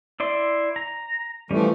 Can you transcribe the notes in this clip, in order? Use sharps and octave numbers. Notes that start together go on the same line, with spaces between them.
E4 D5 C6
A#5
E3 F3 G3 A3 C#4